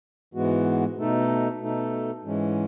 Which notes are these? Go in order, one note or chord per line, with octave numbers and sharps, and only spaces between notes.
G#2 E3 G#3 B3 F#4
B2 A3 D#4 A4
B2 A3 D#4 A4
G#2 E3 G#3 C#4